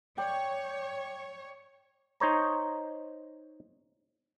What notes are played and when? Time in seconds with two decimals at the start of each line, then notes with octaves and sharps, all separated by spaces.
0.18 C#5 D5 G5
2.20 D#4 C5 C#5 A#5